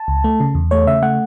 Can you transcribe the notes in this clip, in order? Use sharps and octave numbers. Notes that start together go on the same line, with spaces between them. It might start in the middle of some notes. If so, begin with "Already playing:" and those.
Already playing: A5
C#2
A3
C#3
E2
A3 C#5
C#3 E5
A3 F#5